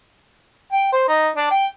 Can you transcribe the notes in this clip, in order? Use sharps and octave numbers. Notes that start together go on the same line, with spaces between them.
G5
C5
D#4
D4
G5